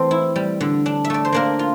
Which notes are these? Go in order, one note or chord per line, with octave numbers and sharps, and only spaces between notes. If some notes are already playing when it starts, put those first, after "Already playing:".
Already playing: E3 A3 C4 A4
E4
G3
D3
D4
E5
A3 D5
C5
A#3 D4 A#4
F4